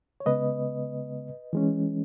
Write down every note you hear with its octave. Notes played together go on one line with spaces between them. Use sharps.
C#5
C#3 G#3 B3 B4 D#5
E3 G#3 C#4